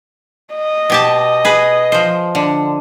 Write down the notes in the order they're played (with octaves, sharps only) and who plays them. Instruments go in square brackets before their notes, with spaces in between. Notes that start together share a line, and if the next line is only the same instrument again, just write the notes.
[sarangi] D#5
[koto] B2 G4 A5
G#4 B4
F3 C5
D3